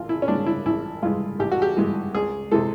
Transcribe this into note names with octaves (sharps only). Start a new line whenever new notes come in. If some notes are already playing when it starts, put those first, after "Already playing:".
Already playing: A1 F4
E4
C#4
G2 E3 G#3 D4
E4
A1 E4
G2 E3 G#3 F4
A1 G4
F#4
G4
G2 E3 G#3
C#2 G#4
C3 E3 G#3 A4